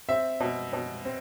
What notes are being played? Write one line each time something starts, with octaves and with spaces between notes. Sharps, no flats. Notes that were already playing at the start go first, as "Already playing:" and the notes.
C4 E5
B2
B2
C4